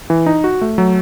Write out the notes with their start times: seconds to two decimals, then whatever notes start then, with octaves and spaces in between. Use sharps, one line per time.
0.10 E3
0.26 D#4
0.44 F#4
0.61 A3
0.78 F#3